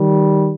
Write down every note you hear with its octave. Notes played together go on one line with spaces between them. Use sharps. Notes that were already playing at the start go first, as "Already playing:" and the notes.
Already playing: D#3 G3